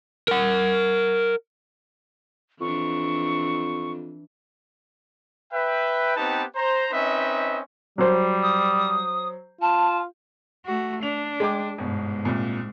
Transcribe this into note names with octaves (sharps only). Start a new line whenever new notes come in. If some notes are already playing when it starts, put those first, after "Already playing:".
A#4 F#5
F2 E3 D4 C#6
B4 E5 G5
B3 C4 D#4 G4 B4 A5
C5 A#5
C4 C#4 D#4 B4 D#5 E5
F#3 G3 C5
D#6
F4 A5
A3 F#4
D4 F7
G#3 G5 D6
G1 G#2 B2
C2 A#2